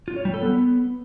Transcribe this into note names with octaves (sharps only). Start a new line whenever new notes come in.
F4
C#5
G3
A4
B3